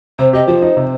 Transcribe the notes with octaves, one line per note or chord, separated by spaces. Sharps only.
C3 C5
G4 D#5
F3 C5
D#4
C3